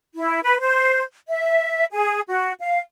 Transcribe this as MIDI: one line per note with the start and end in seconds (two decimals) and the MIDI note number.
0.15 0.39 64
0.44 0.58 71
0.59 1.01 72
1.28 1.84 76
1.91 2.20 68
2.28 2.53 66
2.60 2.78 77